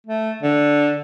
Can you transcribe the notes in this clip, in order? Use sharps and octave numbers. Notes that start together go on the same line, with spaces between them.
A3
D3